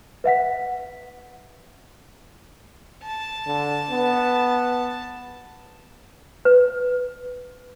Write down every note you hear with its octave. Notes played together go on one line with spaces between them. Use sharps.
B4 E5 F#5 B6
A5
D3
B3
B4